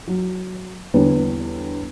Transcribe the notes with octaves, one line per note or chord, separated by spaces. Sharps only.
F#3
E2 D3 G3 B4 C#5